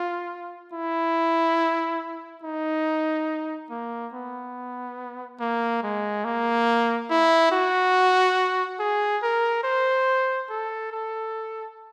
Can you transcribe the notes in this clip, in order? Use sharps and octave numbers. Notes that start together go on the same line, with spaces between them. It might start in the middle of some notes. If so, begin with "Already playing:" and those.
Already playing: F4
E4
D#4
A#3
B3
A#3
G#3
A#3
E4
F#4
G#4
A#4
C5
A4
A4